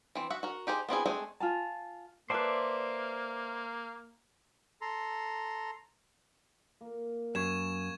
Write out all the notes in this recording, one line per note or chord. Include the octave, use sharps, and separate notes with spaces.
E3 C4
F#4 E5 F#5
F#4 A#4
D#4 G4 G#4 C5
B3 C4 E4 G#4
G#3 A3 C4 D4 G#4
F4 G#5 A5
A#3 B4 C5 D5 E5 A5
A4 A#5 C6
A#3
F#2 C#6 G#6 E7